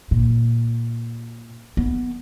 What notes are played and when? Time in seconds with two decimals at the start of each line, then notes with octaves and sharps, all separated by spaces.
0.11 A#2
1.77 B3